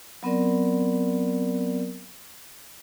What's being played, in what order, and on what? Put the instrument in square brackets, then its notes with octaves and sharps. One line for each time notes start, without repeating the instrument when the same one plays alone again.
[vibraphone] F#3 B3 C4 A#4 D5